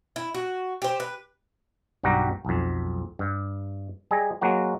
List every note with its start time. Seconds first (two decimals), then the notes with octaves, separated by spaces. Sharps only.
0.16 E4
0.34 F#4
0.82 G4 C5
1.00 B4
2.03 B1 G2 G3 F#4 G4 A#5
2.45 B1 F2
3.19 G2
4.11 G3 G#4 D#5
4.41 F#3 G#3 A#3 F#4